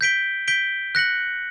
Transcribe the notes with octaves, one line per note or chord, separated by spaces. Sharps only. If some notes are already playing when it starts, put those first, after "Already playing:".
G6 B6 D7 G7
G6 B6 D7 G7
F#6 A#6 C#7 F#7